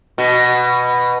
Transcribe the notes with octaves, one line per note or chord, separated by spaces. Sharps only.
B2